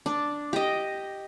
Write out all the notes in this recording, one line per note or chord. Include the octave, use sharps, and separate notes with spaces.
D4
G4 D#5